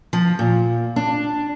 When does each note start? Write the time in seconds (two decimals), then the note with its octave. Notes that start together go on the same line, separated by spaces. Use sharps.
0.13 F3
0.39 A#2
0.96 D4